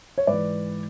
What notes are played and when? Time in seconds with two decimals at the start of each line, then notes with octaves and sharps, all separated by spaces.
0.18 C#5
0.27 G#2 E3 B4 D5